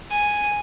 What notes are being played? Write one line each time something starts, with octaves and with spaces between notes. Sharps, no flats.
G#5